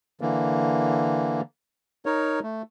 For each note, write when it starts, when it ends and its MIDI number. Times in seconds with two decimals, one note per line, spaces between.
0.21 1.41 50
0.21 1.41 52
0.21 1.41 58
2.06 2.40 63
2.06 2.40 70
2.06 2.40 73
2.43 2.62 57